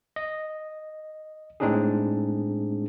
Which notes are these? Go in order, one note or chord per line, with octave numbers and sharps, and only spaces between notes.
D#5
A2 G#3 C4 D4 D#4 G#4